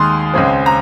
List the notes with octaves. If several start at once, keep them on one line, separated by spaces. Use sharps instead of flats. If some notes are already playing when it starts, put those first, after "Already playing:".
Already playing: D#2 D#3 G#3 C6 D#6
C#2 C#3 G#3 C4
A#5